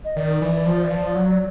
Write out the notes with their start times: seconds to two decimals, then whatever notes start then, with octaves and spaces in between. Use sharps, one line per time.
0.05 D#5
0.16 D#3 D5
0.42 E3
0.66 F3
0.83 E3
0.91 F3
1.16 F#3